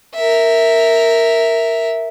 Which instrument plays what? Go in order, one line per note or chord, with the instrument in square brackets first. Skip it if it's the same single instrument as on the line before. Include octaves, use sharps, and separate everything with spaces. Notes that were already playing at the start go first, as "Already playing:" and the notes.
[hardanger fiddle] A#4 E5